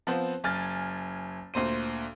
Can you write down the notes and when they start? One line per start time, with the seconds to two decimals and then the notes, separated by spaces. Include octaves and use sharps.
0.07 F3 B3 C4
0.44 F#1 G#5 F6 A6
1.54 D2 A#2 C5 D#7